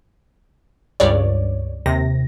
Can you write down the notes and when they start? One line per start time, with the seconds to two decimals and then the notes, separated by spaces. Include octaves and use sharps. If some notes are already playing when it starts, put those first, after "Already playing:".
1.00 C#2 G2 C#5 D5
1.86 D#2 C3 A#6